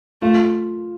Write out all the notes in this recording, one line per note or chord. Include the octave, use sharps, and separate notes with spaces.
A3 F4